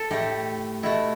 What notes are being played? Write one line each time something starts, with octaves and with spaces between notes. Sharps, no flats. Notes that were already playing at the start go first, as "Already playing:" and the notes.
Already playing: A4
A2 A3 G4
B2 A3 E4